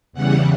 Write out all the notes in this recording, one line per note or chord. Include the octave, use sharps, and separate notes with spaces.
E2 C#3 E3 G3 F#5